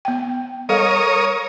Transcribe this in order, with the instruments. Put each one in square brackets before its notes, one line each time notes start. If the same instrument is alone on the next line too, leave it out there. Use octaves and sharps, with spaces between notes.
[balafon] B3 G5
[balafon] G3 A4 F5 [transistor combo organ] A#4 C#5 D#6